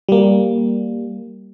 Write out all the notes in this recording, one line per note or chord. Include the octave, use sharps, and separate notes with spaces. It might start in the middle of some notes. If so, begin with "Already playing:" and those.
G3 A#3